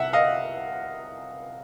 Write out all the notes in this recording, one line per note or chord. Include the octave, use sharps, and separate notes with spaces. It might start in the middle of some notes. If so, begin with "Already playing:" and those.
Already playing: C2 E5 F#5
D#5 F5